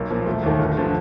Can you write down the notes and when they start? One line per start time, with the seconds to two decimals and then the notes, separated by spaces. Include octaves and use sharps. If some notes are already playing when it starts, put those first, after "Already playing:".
Already playing: B1 A#3
0.11 A#2 F3
0.26 E1 A3
0.43 D#2 D#3
0.59 G1
0.77 D3 F3